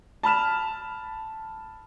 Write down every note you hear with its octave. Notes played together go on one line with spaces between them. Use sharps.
A5 B5 F6 E7